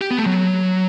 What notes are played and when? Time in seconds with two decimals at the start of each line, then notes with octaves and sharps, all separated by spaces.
0.01 G4
0.11 B3
0.18 A3
0.26 F#3